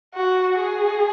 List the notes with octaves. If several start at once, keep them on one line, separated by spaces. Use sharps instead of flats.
F#4
G#4